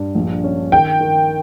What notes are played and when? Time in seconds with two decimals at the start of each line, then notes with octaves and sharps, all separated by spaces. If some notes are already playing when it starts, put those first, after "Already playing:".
Already playing: G2
0.15 A#1
0.44 C#4
0.72 D#3 G5
1.01 D#3